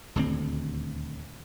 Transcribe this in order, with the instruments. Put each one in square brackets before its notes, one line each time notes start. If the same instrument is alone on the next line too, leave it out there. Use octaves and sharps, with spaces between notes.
[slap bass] D#1 D2 C4